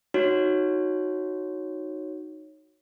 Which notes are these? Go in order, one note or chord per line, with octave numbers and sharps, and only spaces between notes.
D#4 F#4 C#5